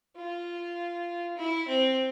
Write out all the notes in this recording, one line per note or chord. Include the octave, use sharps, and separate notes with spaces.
F4
E4
C4